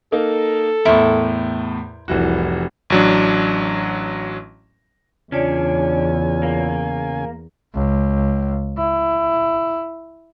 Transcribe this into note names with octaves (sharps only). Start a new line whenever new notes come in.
A#3 D#4 A4
E2 A2 E4 A#4 C5
F1 C2 E3 F#4
A1 F#3 D4
E2 C#3 C#4 D4 F4 C#5 D5 G#5
A#3
C#2
E4